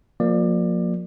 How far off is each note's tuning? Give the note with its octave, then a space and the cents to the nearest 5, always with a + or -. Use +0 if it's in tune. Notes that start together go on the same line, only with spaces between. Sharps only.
F3 +35 A#3 +0 D5 +25